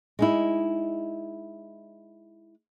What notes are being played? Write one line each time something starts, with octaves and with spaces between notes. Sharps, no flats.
G#3 D#4 E4